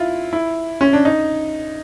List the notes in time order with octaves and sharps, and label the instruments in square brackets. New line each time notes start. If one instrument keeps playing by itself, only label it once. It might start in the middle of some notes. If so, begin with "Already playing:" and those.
Already playing: [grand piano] E4 F4
E4
C#4
D4
D#4